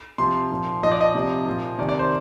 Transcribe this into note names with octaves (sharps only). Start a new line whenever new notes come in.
C3 F3 C6
A#2 F3
A#2 F3 D#5
D5
D#5
C3 F3
A#2 F3
C3 D#3 D5
D5
C5